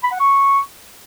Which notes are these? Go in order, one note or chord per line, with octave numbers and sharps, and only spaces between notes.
B5
F#5
C#6